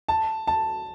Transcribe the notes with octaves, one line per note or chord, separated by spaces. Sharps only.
A5
A5